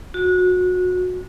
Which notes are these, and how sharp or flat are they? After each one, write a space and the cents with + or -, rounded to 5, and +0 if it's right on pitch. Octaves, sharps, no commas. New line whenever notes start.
F#4 -25